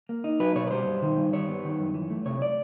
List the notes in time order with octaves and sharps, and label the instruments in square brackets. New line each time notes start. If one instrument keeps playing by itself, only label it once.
[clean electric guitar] A#3
D#4
F#3 B4
B2 C#5
B4
G3 C5
G2
D#3
G2
G3 C#5
B3
D#3
F#2
E3
A3
C3 C#5
D5